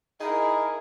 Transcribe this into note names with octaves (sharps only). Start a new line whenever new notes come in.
D#4 E4 G#4 A#4